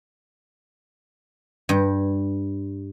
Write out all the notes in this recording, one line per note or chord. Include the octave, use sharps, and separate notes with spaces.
G2